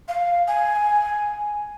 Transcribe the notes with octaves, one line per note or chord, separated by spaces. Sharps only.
F5
G#5